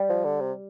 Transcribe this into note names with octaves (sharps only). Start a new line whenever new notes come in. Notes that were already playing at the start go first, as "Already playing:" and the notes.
Already playing: G3
F3
D3
C3